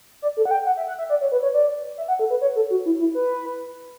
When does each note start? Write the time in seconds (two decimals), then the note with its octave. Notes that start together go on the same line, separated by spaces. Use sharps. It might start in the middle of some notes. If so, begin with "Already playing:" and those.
0.22 D5
0.37 A4
0.45 F#5
0.51 G5
0.66 F#5
0.77 E5
0.88 F#5
0.99 E5
1.10 D5
1.21 C#5
1.32 B4
1.43 C#5
1.54 D5
1.98 E5
2.08 F#5
2.19 A4
2.30 B4
2.41 C#5
2.56 A4
2.70 F#4
2.86 E4
3.00 E4
3.15 B4